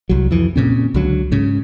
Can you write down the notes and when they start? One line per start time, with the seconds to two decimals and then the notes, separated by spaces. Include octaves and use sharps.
0.09 C2 F#3
0.31 F2 E3
0.56 A#2 C#3 C4
0.94 C#2 D3 F#3
1.31 G#2 C#3